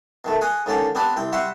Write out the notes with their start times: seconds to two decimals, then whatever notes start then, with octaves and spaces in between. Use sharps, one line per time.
0.25 B2 D#3 A3
0.41 F#4 G#4 F#5 G#5
0.66 D#2 G#2 D3 C#4 D5 G5
0.95 B3 C4 D4 G4 B4
1.16 C2 C4 G5
1.32 G3 F#4 E5 G5 C6 C#6